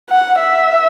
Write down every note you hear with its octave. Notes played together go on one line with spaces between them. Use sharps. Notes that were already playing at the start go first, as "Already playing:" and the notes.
F#5
E5